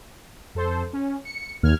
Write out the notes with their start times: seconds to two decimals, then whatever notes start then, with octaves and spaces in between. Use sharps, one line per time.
0.55 F2 A4 C5
0.93 C#4
1.25 C#7
1.63 D#2 F6 G#6